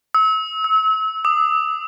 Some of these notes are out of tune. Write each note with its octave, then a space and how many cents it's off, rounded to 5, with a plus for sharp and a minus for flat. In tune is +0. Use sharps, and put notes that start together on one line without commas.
E6 -35
E6 -25
D#6 -35